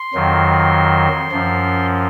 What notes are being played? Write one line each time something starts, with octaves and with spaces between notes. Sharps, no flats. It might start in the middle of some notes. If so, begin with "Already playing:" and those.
Already playing: C6
F2 D#3 F#3
F#2 F3